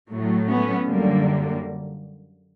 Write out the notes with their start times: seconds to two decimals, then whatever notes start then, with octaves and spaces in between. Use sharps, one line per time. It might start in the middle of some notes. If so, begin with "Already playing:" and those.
0.09 A2 F#3 A3
0.49 B3 C#4
0.88 F#2 D3 G3 A#3